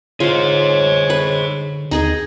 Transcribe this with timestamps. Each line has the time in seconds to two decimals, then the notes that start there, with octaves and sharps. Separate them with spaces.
0.20 D3 F4 G#4 C5 C#5
1.10 B4
1.91 D#2 D#4 G#4 D#5